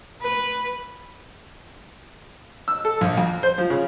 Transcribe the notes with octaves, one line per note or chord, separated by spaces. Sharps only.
B4
E6
A4
A#1
F2
C5
F3
C#3